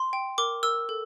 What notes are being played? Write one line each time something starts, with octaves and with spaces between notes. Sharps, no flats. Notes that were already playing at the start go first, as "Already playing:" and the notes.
Already playing: C6
G5
A#4 D6
A#4 E6
A4